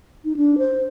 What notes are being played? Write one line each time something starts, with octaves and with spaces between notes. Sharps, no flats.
D#4
D4
C5